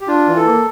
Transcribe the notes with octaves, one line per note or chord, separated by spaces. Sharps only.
G4
D4 F4
E3
A4
A#3